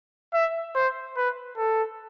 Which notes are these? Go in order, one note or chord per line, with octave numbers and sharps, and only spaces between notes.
E5
C5
B4
A4